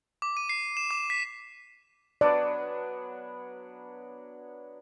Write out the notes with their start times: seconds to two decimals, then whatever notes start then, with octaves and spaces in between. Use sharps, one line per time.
0.22 D6
0.37 D#7
0.49 C7
0.77 E7
0.91 D6
1.10 B6
2.21 F#3 B3 D4 D5